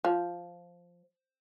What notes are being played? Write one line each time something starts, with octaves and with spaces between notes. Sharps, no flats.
F3